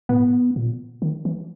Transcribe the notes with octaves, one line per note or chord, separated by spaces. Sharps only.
A2 B3
A#2
D#3
E3